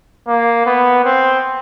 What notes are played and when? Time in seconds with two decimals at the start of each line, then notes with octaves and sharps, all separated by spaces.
0.27 A#3
0.66 B3
1.04 C4